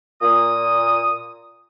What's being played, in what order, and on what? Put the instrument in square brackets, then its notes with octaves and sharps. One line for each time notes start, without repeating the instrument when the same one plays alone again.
[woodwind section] A#2 D#6